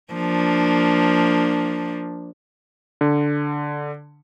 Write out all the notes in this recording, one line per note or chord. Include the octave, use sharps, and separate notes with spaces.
F3 A#3 D4
D3